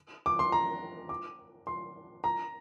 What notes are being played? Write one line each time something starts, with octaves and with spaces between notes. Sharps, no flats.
D6
C6
A#5
D6
C6
A#5